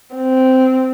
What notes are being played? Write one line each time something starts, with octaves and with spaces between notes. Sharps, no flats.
C4